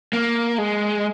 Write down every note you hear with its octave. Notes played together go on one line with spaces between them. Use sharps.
A#3
G#3